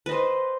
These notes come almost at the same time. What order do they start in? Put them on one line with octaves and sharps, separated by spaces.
B4 D#5 C5